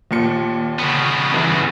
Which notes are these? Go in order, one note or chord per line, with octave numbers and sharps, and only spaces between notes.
D#2 A#2 C#7
C#3 B3
G2 E3